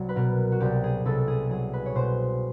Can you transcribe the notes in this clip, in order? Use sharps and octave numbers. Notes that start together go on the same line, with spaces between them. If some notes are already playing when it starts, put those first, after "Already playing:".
Already playing: C2 F#3
B4
B2 A#4
F#4
C2 G4
G#4
C2 A4
G#4
F#3 G#4
B4
C#5
B2 C5